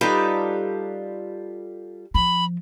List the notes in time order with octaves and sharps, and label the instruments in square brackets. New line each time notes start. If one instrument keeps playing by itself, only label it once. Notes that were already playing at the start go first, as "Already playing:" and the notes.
[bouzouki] G3 F4 A4 [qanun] D#4 B4
[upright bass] F3 [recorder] B5